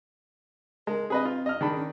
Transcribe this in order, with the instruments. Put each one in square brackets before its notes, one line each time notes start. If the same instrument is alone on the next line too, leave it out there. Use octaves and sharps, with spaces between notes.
[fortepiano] G#3 [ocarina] A#4
[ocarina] C4 [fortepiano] G#4 B4 D#5
[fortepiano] F4
D#5 F6
[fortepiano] D#3 D4 B5 [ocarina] G#4
[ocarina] C#4